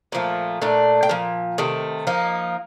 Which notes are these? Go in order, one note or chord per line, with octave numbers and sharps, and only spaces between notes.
A#2 F3 A3
A#2 A3 D4
G5
A#2 F3
C3 D#3 A3
F3 A#3 D#4